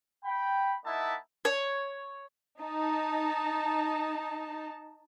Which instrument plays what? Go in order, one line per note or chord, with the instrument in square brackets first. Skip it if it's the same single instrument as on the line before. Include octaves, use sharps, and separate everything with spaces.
[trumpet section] G5 B5
A#3 D#4 E4 E5 F#5 A5
[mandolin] C#5
[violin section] D#4 A5